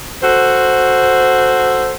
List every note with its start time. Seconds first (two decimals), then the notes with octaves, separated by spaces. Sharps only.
0.23 F#4 A4 C5